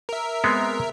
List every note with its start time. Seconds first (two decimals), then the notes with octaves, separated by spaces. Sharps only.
0.09 A#4 E5
0.44 G#3 B3 C4